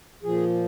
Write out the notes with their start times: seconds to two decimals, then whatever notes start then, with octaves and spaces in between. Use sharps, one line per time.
0.23 A#2 F3 G#4